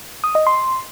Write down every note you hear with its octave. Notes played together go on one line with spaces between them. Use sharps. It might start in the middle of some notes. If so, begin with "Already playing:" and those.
D#6
D#5
C6